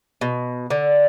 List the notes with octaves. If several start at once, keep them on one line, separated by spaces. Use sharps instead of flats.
B2
D3